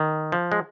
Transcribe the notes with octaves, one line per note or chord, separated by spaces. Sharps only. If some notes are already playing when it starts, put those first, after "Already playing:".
Already playing: D#3
F3
G#3